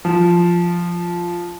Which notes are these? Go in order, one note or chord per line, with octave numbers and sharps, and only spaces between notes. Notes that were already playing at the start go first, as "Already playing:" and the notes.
F3